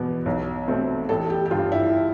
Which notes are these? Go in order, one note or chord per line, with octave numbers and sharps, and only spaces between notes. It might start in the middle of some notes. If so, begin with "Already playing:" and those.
Already playing: E2 B2 B3
B1
B2 A3 C4
A1 A4
G4
G4
G2 D3 F4
E4